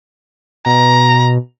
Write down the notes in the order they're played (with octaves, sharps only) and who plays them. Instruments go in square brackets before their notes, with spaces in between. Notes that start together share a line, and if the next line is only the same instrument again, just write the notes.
[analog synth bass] B2 [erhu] A#5